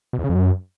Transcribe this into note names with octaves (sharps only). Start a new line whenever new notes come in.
B2
E2
C#3
F2
F#2